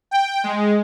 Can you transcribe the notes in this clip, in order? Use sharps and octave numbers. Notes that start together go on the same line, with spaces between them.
G5
G#3